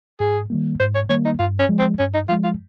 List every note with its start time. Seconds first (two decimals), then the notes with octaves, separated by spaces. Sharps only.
0.20 G#2 G#4
0.50 D#3 G3 A#3
0.80 G#2 C5
0.95 C#5
1.10 D#3 G3 A#3 C#5
1.25 D#4
1.39 G2 F4
1.60 C#4
1.69 F3 G#3
1.79 C4
1.99 G2 C#4
2.14 D#4
2.29 F3 G#3 F4
2.44 F4